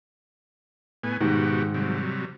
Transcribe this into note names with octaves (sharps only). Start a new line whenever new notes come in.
A2 B3 G#5
G#2 B2 D#3 F#4 G4
C3 F#3 G3